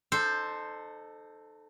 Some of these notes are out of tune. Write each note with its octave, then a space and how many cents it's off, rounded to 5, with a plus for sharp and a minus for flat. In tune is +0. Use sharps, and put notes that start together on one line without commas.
D#4 -35 A4 +0 C5 +0